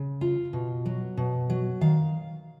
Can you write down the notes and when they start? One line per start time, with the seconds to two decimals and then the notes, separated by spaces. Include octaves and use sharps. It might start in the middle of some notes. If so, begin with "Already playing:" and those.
Already playing: C#3
0.21 F4
0.53 B2
0.86 F#3
1.17 B2
1.50 F#3
1.81 D#3 F5